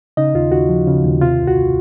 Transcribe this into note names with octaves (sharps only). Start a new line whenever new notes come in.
C#3 D#4 D#5
D#2 F4
D#2 F#4
F3
C#3
D#2
C3 F4
C2
F#4